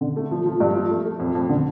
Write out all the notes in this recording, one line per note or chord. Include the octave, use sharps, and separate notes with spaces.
D3
A3
F3
F3
G2
F3
A3
A3
F2
F2
D3